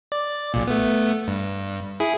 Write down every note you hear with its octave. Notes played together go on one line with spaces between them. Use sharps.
D5
B1 A#2
A3 B3
G2
E4 G#4